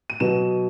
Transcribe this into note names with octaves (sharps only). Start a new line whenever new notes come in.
D#7
B2 F#3 B3 E7